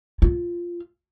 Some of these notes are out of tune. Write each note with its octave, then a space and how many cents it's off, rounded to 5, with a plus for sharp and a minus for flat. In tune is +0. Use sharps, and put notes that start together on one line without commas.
F4 -5